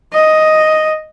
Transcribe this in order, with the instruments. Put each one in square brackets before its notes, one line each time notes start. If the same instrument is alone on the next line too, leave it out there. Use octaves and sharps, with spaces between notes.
[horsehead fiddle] D#5